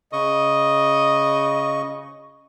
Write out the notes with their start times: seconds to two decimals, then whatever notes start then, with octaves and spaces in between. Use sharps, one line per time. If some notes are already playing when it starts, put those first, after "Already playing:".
0.13 C#3 D#5 C#6